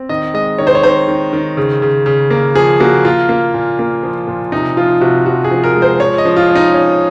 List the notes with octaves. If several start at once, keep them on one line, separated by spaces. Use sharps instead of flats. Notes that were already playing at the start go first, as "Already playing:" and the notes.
Already playing: C4
D#3 D#5
G#3 D#5
D#3 C#5
C5
C#5
D#3 C5
D#3
D#3
C#3
C#3
C#3
A#3
F3 G#4
A#3 F#4
A#3 F4
A#3
A#2
A#3
F3
A#2
C3 D#4
F3 F4
C3 F#4
F3 F#4
G#4
F3
A#4
G#3
C5
F3 C#5
D#5
F3
F4
C#4
D#4
C#4